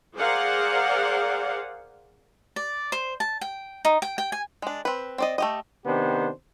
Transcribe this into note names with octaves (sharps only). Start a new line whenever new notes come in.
G#4 A#4 C5 D5 F5 F#5
D5
C5
A5
G5
D#4
G5
G5
G#5
G#3 D4
C4 B4
C4 D5 D#5
A3 G4 D#5
C3 D#3 B3 D4 G4 C5